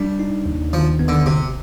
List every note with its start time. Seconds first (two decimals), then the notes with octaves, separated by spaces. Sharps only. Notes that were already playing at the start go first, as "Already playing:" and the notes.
Already playing: G3 D4
0.19 D#4
0.46 D#2
0.73 D#3 F3
0.99 B3
1.08 D3
1.26 G#1 C3